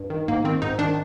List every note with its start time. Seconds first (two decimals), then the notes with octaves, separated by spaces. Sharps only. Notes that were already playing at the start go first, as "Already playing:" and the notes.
Already playing: G2
0.10 D#3
0.28 G#2 A#3
0.44 D#3 C4
0.62 G#2 D#4
0.78 D#3 D4